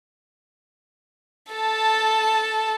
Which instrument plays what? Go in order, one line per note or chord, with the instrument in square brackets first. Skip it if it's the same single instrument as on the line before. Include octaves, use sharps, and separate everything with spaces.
[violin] A4 A5